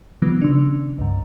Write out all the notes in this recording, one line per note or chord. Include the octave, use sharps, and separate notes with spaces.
C3 D#3 F3 G3 B3
C#3 D4
C2 G2